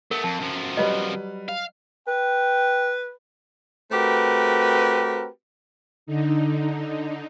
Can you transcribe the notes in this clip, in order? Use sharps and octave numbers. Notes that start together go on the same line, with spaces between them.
A3 B3 A#4
F2 A5
F#2 F3
F#3 G3 B4 D#5
F5
B4 G5
A3 C4 F#4 G4 A#4 B4
D3 D#4